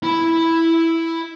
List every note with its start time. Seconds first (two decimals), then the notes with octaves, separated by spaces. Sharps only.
0.03 E4 B5